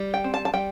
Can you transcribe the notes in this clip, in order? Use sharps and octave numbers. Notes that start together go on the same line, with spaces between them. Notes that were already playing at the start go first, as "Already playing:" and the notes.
Already playing: G3
G5
C4
A5
A5
G3 G5